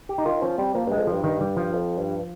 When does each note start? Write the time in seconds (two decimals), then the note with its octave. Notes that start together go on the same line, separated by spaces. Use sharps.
0.09 G4
0.18 D#4
0.25 D#3 F4
0.42 F3 C#4
0.58 G3 C4
0.74 F3 A#3
0.87 G2 G#3
0.99 F2
1.07 F3
1.12 G2
1.23 G2 D#3
1.41 G3
1.57 F3
1.74 F2
1.98 G2